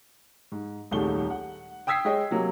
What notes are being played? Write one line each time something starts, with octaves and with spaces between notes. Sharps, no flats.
G#2
D#1 C2 D#3 G#3 A3 G7
F#5
G5 D#6 E6 G#6 B6 C7
G#3 G#4 C#5 D#5 G5
C3 F#3 A#3